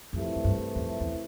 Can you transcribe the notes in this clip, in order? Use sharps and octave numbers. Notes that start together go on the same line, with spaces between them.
C2 F2 C3 E3 A3 E4
F2
G2
F2
E2